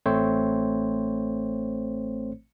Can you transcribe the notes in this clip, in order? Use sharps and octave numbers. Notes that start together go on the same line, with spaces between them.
A1 A3 C4 C5 C#5